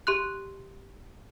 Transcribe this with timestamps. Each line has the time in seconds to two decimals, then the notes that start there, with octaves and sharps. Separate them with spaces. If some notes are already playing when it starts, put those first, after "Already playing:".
0.07 G4 C6 F#6